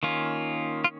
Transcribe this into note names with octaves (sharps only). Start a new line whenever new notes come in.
D#3 A#3 C#4 F4
F4